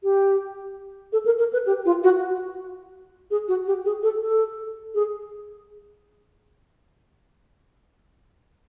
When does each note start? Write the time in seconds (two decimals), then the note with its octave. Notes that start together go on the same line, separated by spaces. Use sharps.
0.03 G4
1.13 A4
1.26 A#4
1.39 A#4
1.53 B4
1.66 G4
1.85 F4
2.04 F#4
3.31 G#4
3.48 F#4
3.67 G4
3.85 G#4
4.03 A4
4.21 A4
4.95 G#4